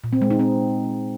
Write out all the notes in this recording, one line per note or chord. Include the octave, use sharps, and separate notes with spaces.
A#2
C4
G#3
D#4
C4